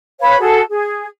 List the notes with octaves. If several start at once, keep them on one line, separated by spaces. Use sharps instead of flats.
B4 C#5 F5 B5
F#4 G#4 A4
G#4